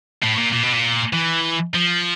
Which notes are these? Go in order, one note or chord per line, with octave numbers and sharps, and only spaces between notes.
A2
A#2
A#2
B2
A#2
E3
F3